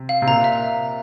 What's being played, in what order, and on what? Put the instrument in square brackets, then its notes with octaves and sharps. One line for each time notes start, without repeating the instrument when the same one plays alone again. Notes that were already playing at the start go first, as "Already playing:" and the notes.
Already playing: [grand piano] C3
[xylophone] F5
[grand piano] C3
[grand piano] A#2 [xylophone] A#5
[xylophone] E5